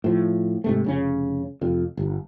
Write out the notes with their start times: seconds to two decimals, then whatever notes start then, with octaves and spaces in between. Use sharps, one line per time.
0.04 A2 F3
0.64 G#2 C3 A3
0.84 F1 C#3 C#4
1.61 F1 F2
1.97 G1